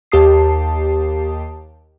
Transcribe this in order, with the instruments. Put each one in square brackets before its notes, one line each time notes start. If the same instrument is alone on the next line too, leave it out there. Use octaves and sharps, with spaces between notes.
[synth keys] D#2 G4 A5 D#6 C7